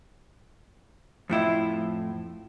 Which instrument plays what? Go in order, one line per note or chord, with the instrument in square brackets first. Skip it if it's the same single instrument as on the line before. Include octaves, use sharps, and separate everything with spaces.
[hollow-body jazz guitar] F2 A2 E4 F4